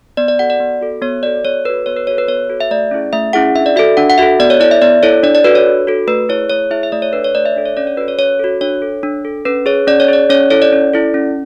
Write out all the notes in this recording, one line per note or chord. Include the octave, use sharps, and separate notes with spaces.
B3 D5
D5
F#4 A4 F#5
D5
B3
F#4 A4
B3 C#5
F#4 A4 D5
B3 C#5
F#4 A4 B4
B3 C#5
B4
F#4 A4 C#5
B4
B3 C#5
F#4 A4
E5
A3 D5
C#4 E4 G#4
A3 E5
C#4 E4 G#4 F#5
D4 E5
D5
F#4 A4 E5
D4 F#5
F#5
F#4 A4 E5
B3 D5
C#5
E4 A4 D5
E5
B3 D5
E4 A4 C#5
D4 D5
D5
F#4 A4 B4
C#5
D4
F#4 A4
A3 B4
E4 G#4 C#5
A3 C#5
E4 G#4 E5
E5
A3 D5
C#5
D4 A4 B4
C#5
A3 D5
E5
D4 A4
C#5
C#4 D5
C#5
F#4 A4 B4
C#5
C#4 C#5
F#4 A4
D4 C#5
A4
D4
A4
C#4 B4
G#4 C#5
C#4 D5
C#5
G#4 D5
C#4 C#5
E4 A4 C#5
D5
C#4
E4 A4
C#4